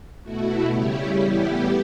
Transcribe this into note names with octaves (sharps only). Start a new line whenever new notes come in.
B2 A3 E4 F#4
C#3 G3 C#4 E4 G4
A2 E3 G3 B3 E4 G4